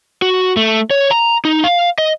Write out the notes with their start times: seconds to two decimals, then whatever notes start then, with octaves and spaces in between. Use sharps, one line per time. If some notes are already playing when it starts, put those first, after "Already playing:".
0.22 F#4
0.57 A3
0.91 C#5
1.11 A#5
1.45 D#4
1.64 F5
1.98 D#5